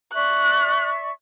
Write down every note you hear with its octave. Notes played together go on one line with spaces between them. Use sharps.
D5 E5 C#6 F#6